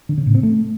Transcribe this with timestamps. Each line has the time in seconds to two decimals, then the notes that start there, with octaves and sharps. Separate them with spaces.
0.09 D3
0.18 C#3
0.26 A2
0.35 C4
0.43 A3